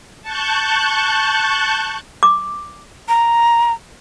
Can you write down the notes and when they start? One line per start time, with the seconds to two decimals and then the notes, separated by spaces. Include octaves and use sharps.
0.22 A5 C#6 F#6 G6
2.23 D6
3.08 A#5